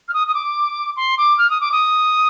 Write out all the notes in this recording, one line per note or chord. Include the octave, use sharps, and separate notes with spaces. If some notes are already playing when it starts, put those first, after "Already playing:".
F6
D#6
D#6
D6
C6
D6
F6
D#6
D6
D#6